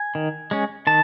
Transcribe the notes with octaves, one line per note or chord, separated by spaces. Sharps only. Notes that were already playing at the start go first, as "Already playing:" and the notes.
Already playing: G#5
D#3
G#3 C#4
D#3 A5